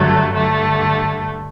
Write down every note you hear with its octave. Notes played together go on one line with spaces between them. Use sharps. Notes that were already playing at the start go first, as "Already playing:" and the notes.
Already playing: G2 D3 F#3 A3
G2 D3 A3